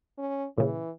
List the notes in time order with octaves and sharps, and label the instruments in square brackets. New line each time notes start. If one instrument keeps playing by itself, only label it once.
[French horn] C#4
[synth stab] A#2 C#3 [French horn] E3